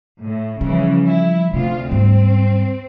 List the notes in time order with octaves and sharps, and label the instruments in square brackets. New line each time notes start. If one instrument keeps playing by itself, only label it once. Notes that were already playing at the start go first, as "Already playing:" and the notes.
[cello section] A2
[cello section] C#3 E3 [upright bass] F3 G3
[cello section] E4
[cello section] D2 F4 [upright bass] C3
[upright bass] G#2 G3 [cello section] C4